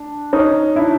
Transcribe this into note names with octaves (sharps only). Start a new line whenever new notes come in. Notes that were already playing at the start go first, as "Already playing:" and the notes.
Already playing: D4
C#4 D#4
D4 E4